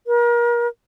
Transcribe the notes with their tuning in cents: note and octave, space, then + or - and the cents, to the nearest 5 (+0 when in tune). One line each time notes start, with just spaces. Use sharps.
A#4 +35